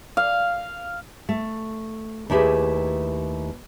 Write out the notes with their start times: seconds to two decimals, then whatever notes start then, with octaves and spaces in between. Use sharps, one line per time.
0.17 F5
1.29 A3
2.30 D#2 A3 E4 G4 G#4 B4